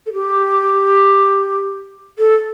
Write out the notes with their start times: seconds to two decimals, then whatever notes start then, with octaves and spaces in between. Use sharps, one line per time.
0.06 A4
0.13 G4
2.18 A4